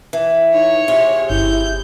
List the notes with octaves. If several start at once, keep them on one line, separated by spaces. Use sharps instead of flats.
E3
D#4 C#5
C3 F4 G#4 E5
G1 E4 G6